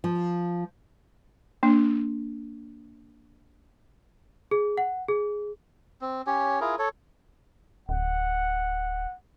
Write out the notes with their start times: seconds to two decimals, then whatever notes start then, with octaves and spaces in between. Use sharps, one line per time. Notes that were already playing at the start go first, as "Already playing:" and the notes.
0.04 F3
1.63 A#3 D4
4.51 G#4
4.78 F#5
5.08 G#4
6.01 C4
6.27 C#4 G4 C#5
6.61 E4 F4 G#4 A#4
6.79 A4 C#5
7.89 D1 F#5